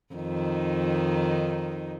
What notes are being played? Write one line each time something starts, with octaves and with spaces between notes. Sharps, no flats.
F2 D#3 D#4